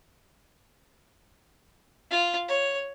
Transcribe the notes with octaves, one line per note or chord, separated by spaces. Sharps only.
F4
C#5